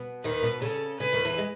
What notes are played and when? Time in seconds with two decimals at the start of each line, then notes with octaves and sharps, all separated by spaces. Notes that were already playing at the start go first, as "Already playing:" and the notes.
Already playing: B2 B3
0.24 D#2 D#3 B4
0.43 B2
0.62 C#3 A4
1.00 C#3 B4
1.13 D#2 D#3
1.25 E2 E3
1.38 G#3